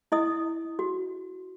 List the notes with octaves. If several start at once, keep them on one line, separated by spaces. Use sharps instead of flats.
E4 D#5 D#6
F#4